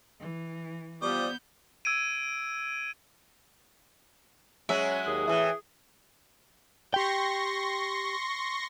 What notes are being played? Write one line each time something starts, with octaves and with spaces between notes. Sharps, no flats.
E3
F3 G3 B3 D6 D#6 G6
E6 G#6 D7 D#7
F#3 G#3 C#4 F#4 E5
D#2 G#4
A2 E3 E4
G4 G5 C6 C#6 A#6